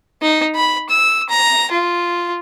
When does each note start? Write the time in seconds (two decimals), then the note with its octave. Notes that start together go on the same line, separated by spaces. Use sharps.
0.22 D#4
0.55 B5
0.90 E6
1.30 A#5
1.71 F4